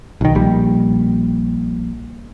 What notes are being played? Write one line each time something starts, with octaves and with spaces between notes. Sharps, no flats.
B1 D#3
A#1 G3